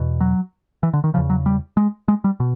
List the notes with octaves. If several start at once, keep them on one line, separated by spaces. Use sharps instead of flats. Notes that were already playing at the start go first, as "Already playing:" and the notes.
Already playing: E2 B2
F#3
E3
D3
D#3
E2 C#3 F3
F#3
G3
G#3
G#3
G3
B2